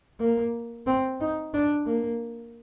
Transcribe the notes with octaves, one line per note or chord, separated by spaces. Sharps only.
A#3
C4
D#4
D4
A#3